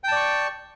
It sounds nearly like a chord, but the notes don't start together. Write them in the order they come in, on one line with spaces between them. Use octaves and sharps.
G5 A5 D5 C#6